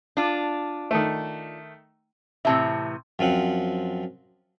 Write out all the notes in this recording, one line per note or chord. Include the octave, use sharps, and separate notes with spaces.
D4 F4
D#3 A3
A2 C3 E3 E5 A5
F#2 F3 C4 F#5